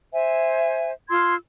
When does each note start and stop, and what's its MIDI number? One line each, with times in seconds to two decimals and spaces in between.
0.13 0.92 72
0.13 0.92 76
0.13 0.92 80
1.09 1.34 65
1.09 1.34 84
1.09 1.34 88
1.09 1.34 92